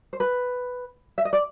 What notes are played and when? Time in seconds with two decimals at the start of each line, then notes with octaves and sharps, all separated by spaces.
0.13 C5
0.20 B4
1.18 E5
1.25 D#5
1.33 D5